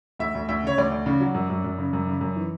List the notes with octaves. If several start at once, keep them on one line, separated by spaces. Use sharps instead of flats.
D2 E5
D2
D2 E5
C#3 C#5
D2 D5
D2
C#3
F#3
F#2
F#2
F#2
C#3
F#2
C#3
F#2
E3